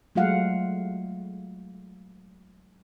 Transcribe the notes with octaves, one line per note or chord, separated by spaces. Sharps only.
F#3 G#3 A3 F4 F5 F#5